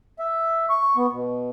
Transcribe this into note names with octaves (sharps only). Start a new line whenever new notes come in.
E5
C#6
B3
B2